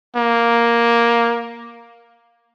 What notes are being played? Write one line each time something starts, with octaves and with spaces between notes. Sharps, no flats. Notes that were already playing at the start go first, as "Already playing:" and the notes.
A#3